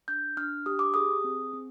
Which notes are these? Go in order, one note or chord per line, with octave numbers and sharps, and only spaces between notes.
D4 G6
D4 F6
G4 D#6
D6
G#4 D#6
C4
C4